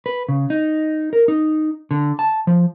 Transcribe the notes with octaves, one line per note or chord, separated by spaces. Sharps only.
B4
C#3
D#4
A#4
D#4
D3
A5
F3